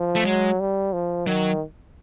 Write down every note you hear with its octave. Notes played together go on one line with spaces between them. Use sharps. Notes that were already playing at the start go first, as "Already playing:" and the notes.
Already playing: F3
A3
F#3 G#3
G3
F3
D#3 F#3